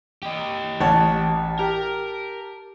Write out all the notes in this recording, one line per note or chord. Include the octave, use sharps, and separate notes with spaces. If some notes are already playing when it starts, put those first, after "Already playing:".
G4 D#5
A1 C#5 F#5 A5
G4 A#4